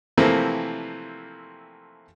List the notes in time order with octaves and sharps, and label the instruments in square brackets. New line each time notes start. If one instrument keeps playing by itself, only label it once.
[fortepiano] C3 E3 F3 A3 A#3 C4